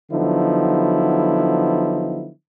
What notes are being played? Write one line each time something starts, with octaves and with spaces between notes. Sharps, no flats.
D3 F3 F#3 B3 D#4 E4